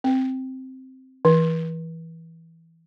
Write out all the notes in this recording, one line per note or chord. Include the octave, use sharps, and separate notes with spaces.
C4
E3